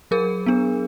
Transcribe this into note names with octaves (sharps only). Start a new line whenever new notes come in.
F#3 G#4 A#4
B3 D4